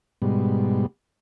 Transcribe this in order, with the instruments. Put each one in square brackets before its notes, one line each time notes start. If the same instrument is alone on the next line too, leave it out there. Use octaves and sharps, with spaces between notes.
[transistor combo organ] G#2 B2 G3